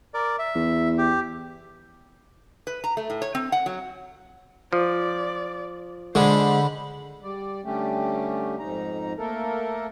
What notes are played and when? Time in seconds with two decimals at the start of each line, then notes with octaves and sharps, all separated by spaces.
0.14 A#4 D5
0.39 E5
0.55 E2
0.98 G4
2.67 B4
2.84 A#5
2.97 A3
3.10 A2
3.22 C#5
3.35 C4
3.52 F#5
3.66 F#3
4.73 F3 D5
6.15 D3 G#3 C5 B5
7.23 G3 D5
7.64 D3 G3 A3 C#4 G4
8.59 F2 G#2 D#4 A#5
9.18 A3 A#3 A4 A#4